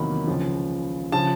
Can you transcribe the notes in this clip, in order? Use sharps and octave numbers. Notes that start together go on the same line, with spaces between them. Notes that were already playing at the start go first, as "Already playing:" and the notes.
Already playing: E2 C3 D#3 F#3 A#3 B5
C#2 C#3 F3
C#3 F3 A5